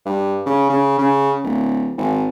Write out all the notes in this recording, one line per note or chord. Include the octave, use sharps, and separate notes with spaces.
G2
C#3
C#3
C#3
D1
G#1